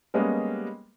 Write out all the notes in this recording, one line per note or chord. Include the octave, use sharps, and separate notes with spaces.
G3 G#3 A#3 B3 C#4 D#5